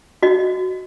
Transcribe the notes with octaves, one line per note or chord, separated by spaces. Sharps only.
F#4 D#5